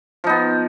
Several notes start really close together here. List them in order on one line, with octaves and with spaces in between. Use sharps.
F3 D#4 B3